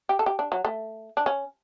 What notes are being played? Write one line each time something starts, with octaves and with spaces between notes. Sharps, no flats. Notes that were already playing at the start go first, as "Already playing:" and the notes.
G4
A4
G4
D4
F#3
A3
D4
C#4